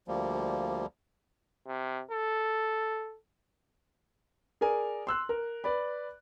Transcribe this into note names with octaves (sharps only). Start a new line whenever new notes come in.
D2 F3 G3 A#3
C3
A4
G#4 A#4 D5 G#5
C6 E6 F#6
A#4
B4 D5 B5